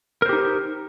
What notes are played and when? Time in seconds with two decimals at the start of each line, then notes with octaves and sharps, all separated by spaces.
0.22 A#4
0.26 C5
0.29 G4
0.33 D#4